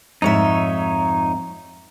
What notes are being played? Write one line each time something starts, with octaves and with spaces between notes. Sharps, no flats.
F2 G#2 D#4 C#5 E5